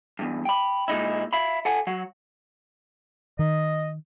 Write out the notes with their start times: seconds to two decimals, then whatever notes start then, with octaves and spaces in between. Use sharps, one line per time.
0.19 E2 G2
0.45 G5 B5
0.88 A#2 G#3 D#4 E4
1.33 E5 F5 B5
1.65 A4 F#5 G#5
1.87 F#3 F#5
3.39 D#3 D#5